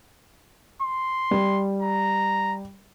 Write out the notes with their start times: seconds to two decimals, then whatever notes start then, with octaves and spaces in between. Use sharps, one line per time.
0.82 C6
1.31 G3
1.82 A#5